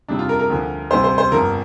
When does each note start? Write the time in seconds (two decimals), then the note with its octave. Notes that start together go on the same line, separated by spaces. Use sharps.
0.08 F2 C3 G3 D4
0.19 F4
0.29 A#4
0.39 A#4
0.50 D2 D3 F3
0.91 D2 C3 G3 C5
1.04 C5
1.18 C5
1.32 G1 F2 F3 A#4